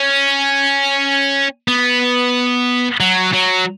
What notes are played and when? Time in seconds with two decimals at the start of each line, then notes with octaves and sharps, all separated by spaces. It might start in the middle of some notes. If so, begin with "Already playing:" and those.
Already playing: C#4
1.68 B3
3.00 F#3
3.33 F#3